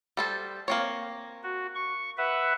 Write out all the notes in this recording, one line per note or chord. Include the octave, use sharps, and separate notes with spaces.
G3 A4 C5
A#3 C4 C#5
F#4
C#6
B4 E5 F#5